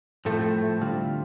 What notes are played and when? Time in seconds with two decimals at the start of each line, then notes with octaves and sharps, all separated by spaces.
0.25 A2 F3 A3 C4
0.81 D3 G3 C4 F4